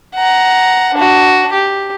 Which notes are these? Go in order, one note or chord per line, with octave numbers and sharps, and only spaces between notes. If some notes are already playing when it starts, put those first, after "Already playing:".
F#5 A#5
D4 F#4
G4